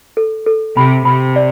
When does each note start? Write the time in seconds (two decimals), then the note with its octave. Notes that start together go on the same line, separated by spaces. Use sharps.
0.17 A4
0.47 A4
0.76 C3 B5
1.05 C3 B5
1.36 D5